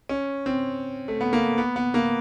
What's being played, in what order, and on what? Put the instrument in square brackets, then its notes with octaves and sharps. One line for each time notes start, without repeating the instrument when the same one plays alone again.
[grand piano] C#4
C4
A3
B3
A#3
B3
B3
A#3